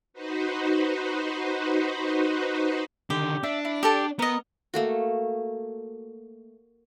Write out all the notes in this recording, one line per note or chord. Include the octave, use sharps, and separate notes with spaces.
D#4 F#4 B4 C5
D3 D#3 G4
D4 E5
E4
G4 A4 A5
B3 A#4 D#5
A3 A#3 F#4